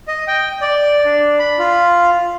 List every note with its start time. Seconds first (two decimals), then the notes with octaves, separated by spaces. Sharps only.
0.08 D#5
0.27 G5
0.61 D5
1.05 D4
1.39 B5
1.59 F4